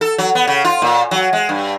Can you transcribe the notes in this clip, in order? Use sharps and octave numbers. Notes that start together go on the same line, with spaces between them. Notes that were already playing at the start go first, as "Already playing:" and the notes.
A4
F#3
B3
C#3
F4
A#2
F#3
G#3
G2